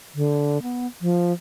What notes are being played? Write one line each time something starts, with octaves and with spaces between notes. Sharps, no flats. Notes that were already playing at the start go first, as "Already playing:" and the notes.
D3
B3
F3